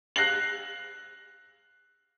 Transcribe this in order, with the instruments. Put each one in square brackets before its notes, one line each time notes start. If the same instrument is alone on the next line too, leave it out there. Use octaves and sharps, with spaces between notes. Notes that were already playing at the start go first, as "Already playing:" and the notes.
[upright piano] F#6 A#6 C7 F#7